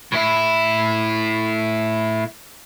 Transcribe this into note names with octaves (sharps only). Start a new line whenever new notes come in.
A2 E4